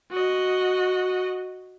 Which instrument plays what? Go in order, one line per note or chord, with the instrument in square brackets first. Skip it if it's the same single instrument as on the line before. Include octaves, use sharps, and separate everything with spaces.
[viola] F#4 D#5